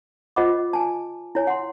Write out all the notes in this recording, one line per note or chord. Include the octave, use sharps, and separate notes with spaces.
F4 C5 D#5 F#5 B5 D6
G#5 A5
E4 C#5 G#5
F#5 C6